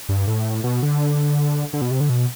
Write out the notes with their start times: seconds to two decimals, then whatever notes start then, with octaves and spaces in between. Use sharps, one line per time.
0.09 G2
0.27 A2
0.64 B2
0.83 D3
1.73 D3
1.81 B2
1.91 C3
2.00 D3
2.09 B2